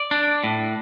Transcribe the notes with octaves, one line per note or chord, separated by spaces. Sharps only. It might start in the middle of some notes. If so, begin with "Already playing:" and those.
Already playing: D5
D4
A2